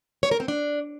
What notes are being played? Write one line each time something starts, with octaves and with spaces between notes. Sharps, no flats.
C#5
A#4
C4
D4